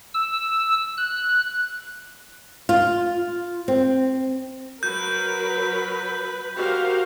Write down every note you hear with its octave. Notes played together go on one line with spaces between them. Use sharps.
E6
F#6
F4
C4
F#3 A#4 B4 G6
F#4 G4 A#4 C5 F5